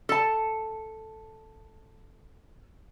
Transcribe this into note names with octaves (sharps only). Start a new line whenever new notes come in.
A4 A5